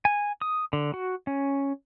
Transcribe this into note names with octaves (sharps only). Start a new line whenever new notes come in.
G#5
D#6
D3
F#4
C#4